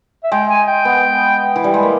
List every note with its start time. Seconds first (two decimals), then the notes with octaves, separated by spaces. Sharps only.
0.24 E5
0.32 G#3 G5
0.49 G#5
0.67 G5
0.85 B3
1.56 E3
1.64 G3
1.74 G#3
1.83 A#3